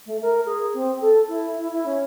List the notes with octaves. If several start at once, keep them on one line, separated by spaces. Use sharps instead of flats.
A3
A#4
G#4
C4
A4
E4
E4
E4
C#4